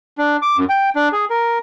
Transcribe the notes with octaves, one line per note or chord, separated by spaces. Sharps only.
D4
D6
F#2
G5
D4
G#4
A#4